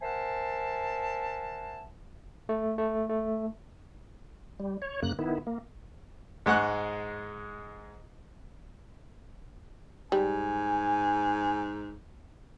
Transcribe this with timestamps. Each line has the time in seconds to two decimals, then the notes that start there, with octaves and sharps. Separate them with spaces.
0.01 A#4 C5 E5 F#5 G#5 A5
2.49 A3
2.78 A3
3.09 A3
4.60 G3
4.82 C#5
5.02 F#2 C#3 A#3 F#6
5.19 D#3 B3 E4
5.47 A#3
6.46 G#2 G#3 F#5 C#6 F#6
10.12 G#2 G3 G#5